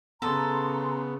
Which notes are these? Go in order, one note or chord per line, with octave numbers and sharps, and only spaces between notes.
C#3 B3 A4 A#5 C6